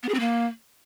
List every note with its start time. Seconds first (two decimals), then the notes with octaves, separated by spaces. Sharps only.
0.03 B3
0.09 G#4
0.14 C4
0.20 A#3